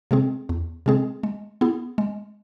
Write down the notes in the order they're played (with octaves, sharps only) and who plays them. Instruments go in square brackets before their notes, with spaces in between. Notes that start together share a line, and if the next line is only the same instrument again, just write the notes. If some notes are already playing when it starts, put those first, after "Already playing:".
[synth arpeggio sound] C3 G#3 C4 G#4
E2
C3 G#3 C4 G#4
G#3
B3 E4 G#4
G#3